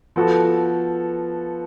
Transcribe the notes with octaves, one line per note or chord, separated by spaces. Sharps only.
F3 B3 F#4 A4